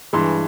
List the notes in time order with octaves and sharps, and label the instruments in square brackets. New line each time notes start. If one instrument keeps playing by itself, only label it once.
[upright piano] G2 E3 G#3 C6